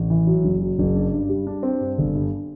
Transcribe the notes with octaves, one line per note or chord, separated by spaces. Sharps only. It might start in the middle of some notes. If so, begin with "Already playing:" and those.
Already playing: A1
E3
F#3
F#1
F#3
F#1
D4
G2
G3
D4
C4
G2
G1
G2